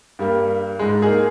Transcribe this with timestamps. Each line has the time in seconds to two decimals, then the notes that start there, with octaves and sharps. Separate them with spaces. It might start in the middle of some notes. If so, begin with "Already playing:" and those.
0.19 G2 G3 A#3
0.79 G#2 G#3
1.02 A#3 D#4 G#4